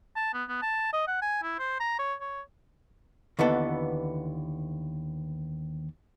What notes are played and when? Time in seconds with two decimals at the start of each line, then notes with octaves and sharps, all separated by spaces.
0.16 A5
0.34 B3
0.49 B3
0.62 A5
0.93 D#5
1.08 F#5
1.22 G#5
1.43 E4
1.59 C5
1.80 A#5
1.99 C#5
2.21 C#5
3.39 D#2 D3 E3 B3 A4